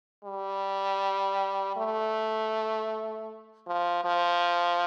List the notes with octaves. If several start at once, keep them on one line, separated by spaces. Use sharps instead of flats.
G3
A3
F3
F3